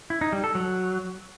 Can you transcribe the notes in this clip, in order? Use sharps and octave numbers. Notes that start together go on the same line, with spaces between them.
E4
D#4
G3
A4
F#3